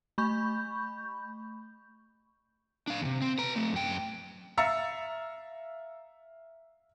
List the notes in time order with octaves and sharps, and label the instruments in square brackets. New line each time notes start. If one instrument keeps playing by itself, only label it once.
[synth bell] A3 B5 C#6 G6
[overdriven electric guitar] D4 F5
E2 C3
C4
B4 A#5
A3 C4
F#2 G5
[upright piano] E5 F5 A#5 E6 A6 C#7